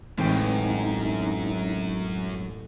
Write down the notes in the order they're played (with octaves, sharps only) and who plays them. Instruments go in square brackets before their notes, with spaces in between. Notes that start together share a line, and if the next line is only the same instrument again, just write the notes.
[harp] A1 G5 [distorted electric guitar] F#2 [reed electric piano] G#3 C4 [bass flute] D#4